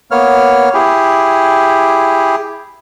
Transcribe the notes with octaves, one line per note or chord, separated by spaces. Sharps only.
A#3 B3 C#5 F6
E4 G4 G#4